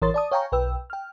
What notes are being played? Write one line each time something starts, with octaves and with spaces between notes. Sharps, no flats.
A1 E3 A#4 C#5 C6 A6
D5 A5 D#6
C#5 F5 G5 G#5 A#5 C#6
B1 B4 G5 E6
G5 F6